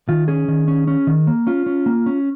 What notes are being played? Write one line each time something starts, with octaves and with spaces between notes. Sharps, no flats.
D#3 F4
C#4 G#4
D#3
C#4
C#4
D#3
A#3
C#4 F4
C#4
A#3
C#4